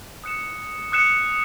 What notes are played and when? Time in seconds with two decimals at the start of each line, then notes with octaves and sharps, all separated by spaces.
0.24 D#6 F#6 C#7 E7
0.92 D#6 F#6 C#7 E7